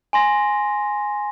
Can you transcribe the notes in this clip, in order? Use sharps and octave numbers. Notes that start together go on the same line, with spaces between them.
G#5 C6 A#6